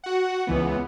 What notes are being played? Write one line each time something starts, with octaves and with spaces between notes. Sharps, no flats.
F#4 F#5
C#2 E3 B3